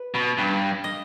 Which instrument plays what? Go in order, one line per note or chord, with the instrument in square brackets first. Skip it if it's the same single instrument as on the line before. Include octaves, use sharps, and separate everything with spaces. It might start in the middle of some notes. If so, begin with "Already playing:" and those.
Already playing: [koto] B4
[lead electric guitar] B2
G2
[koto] D#5